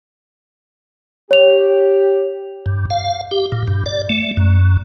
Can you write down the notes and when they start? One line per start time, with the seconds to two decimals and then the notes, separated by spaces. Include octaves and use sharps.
1.31 G4 C#5 F7
2.66 G2
2.90 F5
3.31 G4
3.52 A#2
3.68 G2
3.86 D5
4.09 A3
4.37 F#2